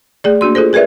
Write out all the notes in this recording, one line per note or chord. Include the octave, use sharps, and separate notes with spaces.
A3 G#4 D5
A#3 D4 F#4 C6
F4 G#4 A4 C5
G#4 A#4 B4 D5 E5